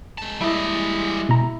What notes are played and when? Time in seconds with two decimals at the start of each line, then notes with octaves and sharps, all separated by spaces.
0.18 G#3 A5
0.41 G3 E4 D#5
1.29 B2 A#5